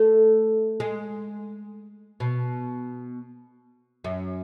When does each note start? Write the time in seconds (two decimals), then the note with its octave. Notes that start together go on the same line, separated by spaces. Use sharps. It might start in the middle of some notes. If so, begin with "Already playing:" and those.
Already playing: A3
0.80 G#3
2.20 B2
4.04 F#2